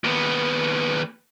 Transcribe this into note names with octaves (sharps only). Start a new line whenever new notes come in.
D#2 B3